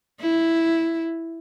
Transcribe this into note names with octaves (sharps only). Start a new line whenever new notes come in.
E4